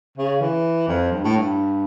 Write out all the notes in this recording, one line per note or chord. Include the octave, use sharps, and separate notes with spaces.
C#3
E3
F2
G2
A2
G2